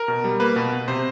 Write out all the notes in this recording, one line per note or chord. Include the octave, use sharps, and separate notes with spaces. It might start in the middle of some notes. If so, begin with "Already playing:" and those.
Already playing: A#4
B2
G3
A#3 B4
B2
B2
C3 C5